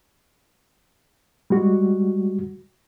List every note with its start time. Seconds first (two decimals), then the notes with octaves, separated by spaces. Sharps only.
1.50 G3 G#3 F#4